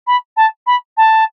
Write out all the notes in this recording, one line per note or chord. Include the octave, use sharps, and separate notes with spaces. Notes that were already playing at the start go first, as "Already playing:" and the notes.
B5
A5
B5
A5